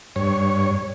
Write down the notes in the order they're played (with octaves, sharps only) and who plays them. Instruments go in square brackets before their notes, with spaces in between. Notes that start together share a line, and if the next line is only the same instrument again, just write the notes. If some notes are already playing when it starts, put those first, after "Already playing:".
[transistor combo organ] G2 C#5